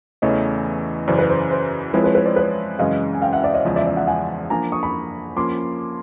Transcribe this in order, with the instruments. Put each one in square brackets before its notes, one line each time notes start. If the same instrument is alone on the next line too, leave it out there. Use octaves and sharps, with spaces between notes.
[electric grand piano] E2 C#3 E3 A3 [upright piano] C#5 D#5
[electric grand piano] F#2 C#3 E3 [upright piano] C5 D5
[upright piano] B4
C5
C5
[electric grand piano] F3 G#3 C4 E4 [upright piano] B4 C#5
[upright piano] B4 C#5
B4 C#5
C5 D5
B4 C#5
[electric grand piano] F#2 C#3 E3 G#3 C#4 [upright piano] D#5 F5
[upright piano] G#5
F5 G5
E5 F#5
D5 E5
C#5 D#5
[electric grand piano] E2 C#3 F3 G#3
[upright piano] D5 E5
D5 E5
E5 F#5
F#5 G#5
[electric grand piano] F3 A#3 D4 [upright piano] G#5 A#5
[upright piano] C#6 D#6
B5 C#6
[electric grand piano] F3 A#3 C#4 [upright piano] C6 D6